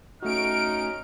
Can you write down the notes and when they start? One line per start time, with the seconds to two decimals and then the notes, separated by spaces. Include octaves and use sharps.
0.23 A3 C#4 D#4 F#4 F6 D7